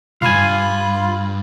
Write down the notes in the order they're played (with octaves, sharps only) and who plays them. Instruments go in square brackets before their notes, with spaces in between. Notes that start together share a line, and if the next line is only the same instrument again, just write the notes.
[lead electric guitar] C2 G2 [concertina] F4 [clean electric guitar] F5 G#5 [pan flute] B5